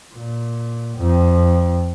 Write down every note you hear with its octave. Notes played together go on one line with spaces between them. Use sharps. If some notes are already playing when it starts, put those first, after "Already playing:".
A#2
F2